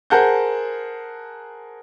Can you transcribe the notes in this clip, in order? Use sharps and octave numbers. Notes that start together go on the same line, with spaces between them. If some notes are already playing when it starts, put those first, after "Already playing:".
G#4 A#4 C5 F#5 A5 G6